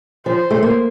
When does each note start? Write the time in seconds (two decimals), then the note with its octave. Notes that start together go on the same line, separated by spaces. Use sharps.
0.26 F3 C5
0.51 A3
0.63 A#3